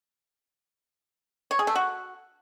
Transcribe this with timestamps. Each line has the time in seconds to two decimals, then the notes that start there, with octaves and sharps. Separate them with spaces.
1.51 C#5
1.59 G#4
1.67 A3
1.75 F#4